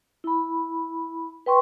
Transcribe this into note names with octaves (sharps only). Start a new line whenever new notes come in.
E4 B5
B4 G5 C6 C#6